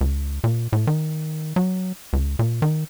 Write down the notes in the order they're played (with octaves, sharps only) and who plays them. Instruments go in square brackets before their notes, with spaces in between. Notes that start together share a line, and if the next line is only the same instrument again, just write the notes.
[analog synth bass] C#2
A#2
A2
D#3
F#3
C#2
A#2
D#3